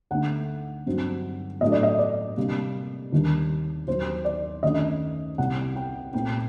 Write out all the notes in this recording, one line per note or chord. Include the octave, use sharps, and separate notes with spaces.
D2 D3 A3 D#4 F#5
G2 F#3 C4 D#4
A2 F#3 A3 D4 D#5
D5
D#5
D5
C3 G3 A#3 D4
D#2 D#3 G3 D4
D#2 D#3 F#3 C5
D5
F#2 D#3 A3 D4 D#5
C2 C3 G3 F#5
G5
A#2 A3 C4 D#4 G5